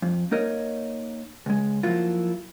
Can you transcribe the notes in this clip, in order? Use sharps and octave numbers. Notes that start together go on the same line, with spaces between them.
F2
A#3 D#4 A#4 C#5 D#5
C#2 G#3
F3 F#3 A#3 E4 F4